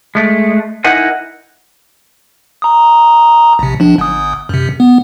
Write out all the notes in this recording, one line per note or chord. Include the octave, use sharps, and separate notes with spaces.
G#3 A3
D#4 E4 A#4 D#5 F#5 G#5
A#5 D#6
A#1 C3
F3 D4
G1 D#6
F#2 C3
B3